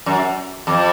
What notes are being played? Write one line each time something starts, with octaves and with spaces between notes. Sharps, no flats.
F#2
F2